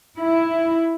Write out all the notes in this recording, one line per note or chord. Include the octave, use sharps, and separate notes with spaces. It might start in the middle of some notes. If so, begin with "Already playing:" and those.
E4